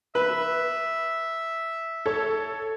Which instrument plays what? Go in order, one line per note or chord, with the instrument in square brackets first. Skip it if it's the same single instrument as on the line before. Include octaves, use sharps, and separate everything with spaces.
[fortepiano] B4 [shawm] E5
[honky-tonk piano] A4 C#5